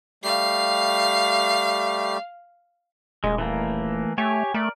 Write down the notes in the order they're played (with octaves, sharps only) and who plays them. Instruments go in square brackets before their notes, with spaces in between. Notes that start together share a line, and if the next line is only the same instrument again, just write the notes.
[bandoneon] G3 A3 G4 [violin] F5 C7
[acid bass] D#1 [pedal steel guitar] G#3
[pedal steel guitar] E3 A3 A#3
[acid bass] A3 [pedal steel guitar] G4 C#5 G#5
[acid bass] A3 [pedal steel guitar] A#4 D5